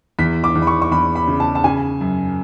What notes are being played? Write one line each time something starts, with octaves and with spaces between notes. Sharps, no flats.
E2 B6
D6
E2
B5
C#6
C#6
E2 B5
B5
C#3
A5
A5
C#3 G#5
F#2